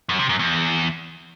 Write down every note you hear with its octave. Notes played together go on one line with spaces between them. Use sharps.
F#2
C3
F#2
E2